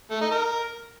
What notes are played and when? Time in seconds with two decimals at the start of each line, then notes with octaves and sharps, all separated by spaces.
0.11 A3
0.21 D#4
0.31 A#4